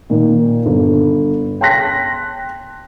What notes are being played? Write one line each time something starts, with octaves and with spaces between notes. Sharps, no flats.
A#2 D#3
G1
G5 A5 C6 F#6 A#6 B6